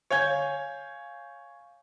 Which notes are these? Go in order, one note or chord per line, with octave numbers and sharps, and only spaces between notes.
C#5 F5 G#5 G6 G#6